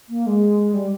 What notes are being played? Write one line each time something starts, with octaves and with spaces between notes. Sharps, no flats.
A#3
G#3
G3